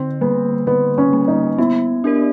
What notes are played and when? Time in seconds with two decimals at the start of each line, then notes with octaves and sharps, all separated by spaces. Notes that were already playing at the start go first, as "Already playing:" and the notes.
Already playing: D3 C4
0.21 G3 A#3 B3
0.67 D3 B3
0.98 C#4
1.13 G3 A#3
1.28 D#4
1.58 B3 E4
2.04 D4 G4 A#4 D5